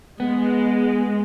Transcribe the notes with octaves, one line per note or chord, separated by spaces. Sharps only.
G#3 B3